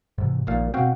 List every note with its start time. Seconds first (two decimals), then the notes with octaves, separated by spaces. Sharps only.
0.18 G#2 C3 E3
0.47 A#1 D#2 A#2 F3 F5
0.74 B2 C4 F#4 F5 G5